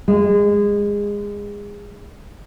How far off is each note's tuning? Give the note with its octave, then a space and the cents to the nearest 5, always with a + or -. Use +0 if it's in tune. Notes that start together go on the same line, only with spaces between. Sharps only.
G#3 -25